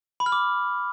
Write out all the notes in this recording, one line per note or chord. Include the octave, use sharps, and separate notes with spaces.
B5
F6
D6